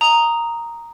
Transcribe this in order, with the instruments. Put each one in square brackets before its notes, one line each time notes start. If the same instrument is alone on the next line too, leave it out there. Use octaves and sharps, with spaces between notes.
[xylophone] A#5 D#6